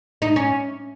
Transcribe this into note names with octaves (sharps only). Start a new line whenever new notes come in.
D#4
C#4